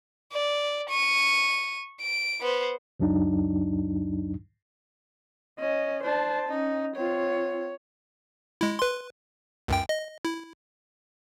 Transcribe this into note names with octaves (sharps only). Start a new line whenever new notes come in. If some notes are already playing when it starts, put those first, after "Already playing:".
D5
C#6 D#7
D7
B3 C5
C#2 F#2 F#3 D4 D#4
C#4 D#5
D4 C5 A5
C#4 D#4
C4 F4 C#5
G#3 E4
B4 C6
C#2 F#2 G5
D#5
E4